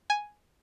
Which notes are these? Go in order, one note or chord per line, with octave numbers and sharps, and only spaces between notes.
G#5